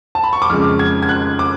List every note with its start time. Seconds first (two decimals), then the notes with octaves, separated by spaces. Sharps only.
0.15 A5
0.24 B5
0.33 C#6
0.42 D6
0.50 F2 C#3 G#3 F6
0.79 G#6
1.03 G#6
1.09 F#6
1.39 D6